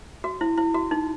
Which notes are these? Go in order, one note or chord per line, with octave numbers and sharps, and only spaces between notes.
F#4
E4
E4
F#4
D#4